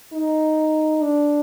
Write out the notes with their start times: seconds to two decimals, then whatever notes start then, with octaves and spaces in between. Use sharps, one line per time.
0.13 D#4
1.01 D4